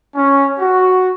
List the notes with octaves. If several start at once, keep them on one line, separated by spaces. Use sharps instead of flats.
C#4
F#4